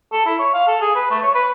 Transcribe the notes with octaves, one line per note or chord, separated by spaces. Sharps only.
A4
E4
C#5
F5
A4
G#4
B4
A3
C#5
B4